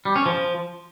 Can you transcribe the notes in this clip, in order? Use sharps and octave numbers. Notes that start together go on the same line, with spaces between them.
G3
C#4
F3